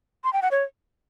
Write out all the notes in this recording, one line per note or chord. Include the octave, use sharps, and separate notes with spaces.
C6
G5
F#5
C#5